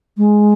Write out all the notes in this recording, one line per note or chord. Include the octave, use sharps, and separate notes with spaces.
G#3